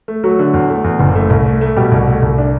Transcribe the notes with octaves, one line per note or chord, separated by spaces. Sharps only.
A3
F#3 A3 F#4
D3
E2
A3
E2
F#1
A3
C2
A3
A3
B2 G3 G4
C2
A3
C2
D4